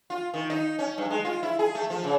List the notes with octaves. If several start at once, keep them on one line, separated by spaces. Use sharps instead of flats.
F4
D#3
D#4
C#4
G2
G#3
F4
E4
G#4
A3
F3
C#3